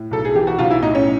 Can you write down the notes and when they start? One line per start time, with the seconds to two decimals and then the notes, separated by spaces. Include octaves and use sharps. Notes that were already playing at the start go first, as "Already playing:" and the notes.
Already playing: A2
0.11 B1 A4
0.25 G#4
0.35 E3 G4
0.47 F#4
0.59 B1 F4
0.71 E4
0.82 A2 D#4
0.95 C#4